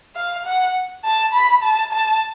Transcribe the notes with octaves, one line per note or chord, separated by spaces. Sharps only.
F5
F#5
A5
B5
A5
A5